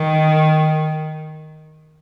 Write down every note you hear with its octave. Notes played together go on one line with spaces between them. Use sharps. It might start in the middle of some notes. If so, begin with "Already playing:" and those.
Already playing: D#3